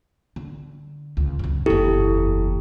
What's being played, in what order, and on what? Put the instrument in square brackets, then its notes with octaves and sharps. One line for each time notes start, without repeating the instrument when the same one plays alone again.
[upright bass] D3
C#2
F#2 C#3
[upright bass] F#1 E2 [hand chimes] E4 G4 A4